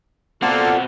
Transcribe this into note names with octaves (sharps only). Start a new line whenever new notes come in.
B2 A#3 C4 F4 A4 D5 F#5